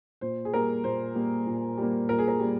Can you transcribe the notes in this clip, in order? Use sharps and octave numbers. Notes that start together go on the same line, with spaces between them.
A#2 C5
G#4
G3 A#3 A#4
A#2 C5
G3 A#3
A#2
G3 A#3
A#2 A#4
G#4
A#4
G3 A#3